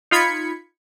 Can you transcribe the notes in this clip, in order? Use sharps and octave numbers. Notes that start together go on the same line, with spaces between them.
D#4 F4 B5 G#6 B6 C#7